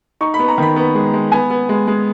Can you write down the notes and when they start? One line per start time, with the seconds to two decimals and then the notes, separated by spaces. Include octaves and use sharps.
0.21 D#4 C#6
0.34 B5
0.39 B3
0.48 A#5
0.58 D#3 B5
0.76 B3
0.95 G#3
1.14 G#3
1.32 B3 G#5
1.50 B3
1.69 G#3
1.88 G#3